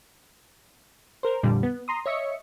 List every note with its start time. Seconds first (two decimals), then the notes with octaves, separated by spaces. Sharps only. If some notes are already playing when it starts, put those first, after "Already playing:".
1.23 A#4 C5
1.43 F2 A#2 D3 G3
1.63 B3
1.88 A#5 C6 D#6
2.06 C#5 D#5 E5 C#7